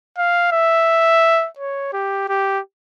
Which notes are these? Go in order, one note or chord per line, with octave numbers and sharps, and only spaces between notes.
F5
E5
C#5
G4
G4